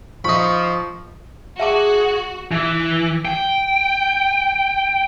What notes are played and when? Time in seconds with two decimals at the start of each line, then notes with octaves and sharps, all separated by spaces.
0.24 F3 D#4 B5 C#6
1.59 F#4 G#4 E5 A5 D6
2.52 E3
3.25 G5